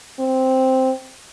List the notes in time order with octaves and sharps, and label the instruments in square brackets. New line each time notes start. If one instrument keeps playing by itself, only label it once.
[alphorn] C4